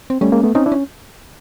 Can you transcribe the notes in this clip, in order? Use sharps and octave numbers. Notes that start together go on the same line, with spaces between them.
C4
G3 A3 C#4
G#3 A#3
A3 B3
C4 C#4 D#4
D4 E4
C#4